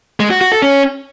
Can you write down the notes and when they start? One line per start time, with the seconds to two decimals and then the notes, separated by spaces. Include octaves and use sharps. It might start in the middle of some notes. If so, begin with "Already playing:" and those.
0.20 G#3
0.30 F#4
0.41 F#4
0.52 A4
0.62 C#4